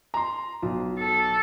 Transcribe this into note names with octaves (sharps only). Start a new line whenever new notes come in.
A#5 C6
B1
A4